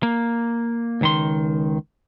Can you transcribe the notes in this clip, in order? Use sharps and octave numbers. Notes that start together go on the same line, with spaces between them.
A#3
C#2 D#3 C6